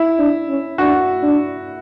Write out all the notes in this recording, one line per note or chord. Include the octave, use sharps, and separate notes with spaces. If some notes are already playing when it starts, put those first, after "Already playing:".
Already playing: E4
D4
C#4
D4 F#4
D4